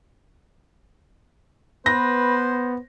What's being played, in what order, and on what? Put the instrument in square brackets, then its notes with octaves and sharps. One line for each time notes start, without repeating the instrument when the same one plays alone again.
[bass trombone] B3 [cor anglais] B4 [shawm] C5 [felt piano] A#6